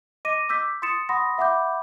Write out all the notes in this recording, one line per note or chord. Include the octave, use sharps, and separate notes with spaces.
D#5 D6 A#6 D#7
D6 E6 G6 B6
C6 D#6 A6 C#7 E7
F#5 B5 C6 D#6 A#6
E5 F#5 B5 D6 G6